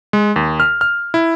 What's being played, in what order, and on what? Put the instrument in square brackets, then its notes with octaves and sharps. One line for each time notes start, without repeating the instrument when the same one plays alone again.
[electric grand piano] G#3
D#2
F6
F6
E4